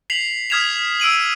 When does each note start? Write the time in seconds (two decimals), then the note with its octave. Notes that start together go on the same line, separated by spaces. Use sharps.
0.10 B6 C7 F7 F#7
0.50 D#6 F6 G#6 B6 E7 F7
1.00 E6 D7 D#7 F#7